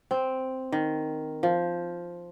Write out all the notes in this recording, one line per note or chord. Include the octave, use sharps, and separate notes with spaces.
C4
D#3
F3